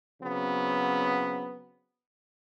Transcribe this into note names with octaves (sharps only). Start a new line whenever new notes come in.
C#3 F#3 B3 C4